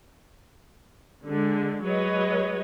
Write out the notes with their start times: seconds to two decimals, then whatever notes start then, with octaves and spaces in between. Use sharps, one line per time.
1.27 D3 G#3
1.84 F#3 G#3 B4 C#5 D#5